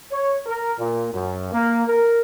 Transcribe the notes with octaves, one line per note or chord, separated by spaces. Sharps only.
C#5
A#4
A#2
F#2
A#3
A#4